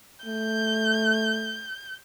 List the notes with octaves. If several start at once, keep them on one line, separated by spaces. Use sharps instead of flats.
A3 G6